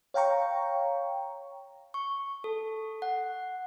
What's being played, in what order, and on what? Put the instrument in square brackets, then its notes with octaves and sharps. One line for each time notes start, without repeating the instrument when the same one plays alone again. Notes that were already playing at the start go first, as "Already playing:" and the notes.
[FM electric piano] C#5 F5 G5 A#5 C#6
[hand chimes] C#6
A4
F#5